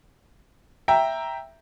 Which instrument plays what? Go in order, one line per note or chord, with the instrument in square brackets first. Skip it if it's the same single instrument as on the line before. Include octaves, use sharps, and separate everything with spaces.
[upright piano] E5 G5 A#5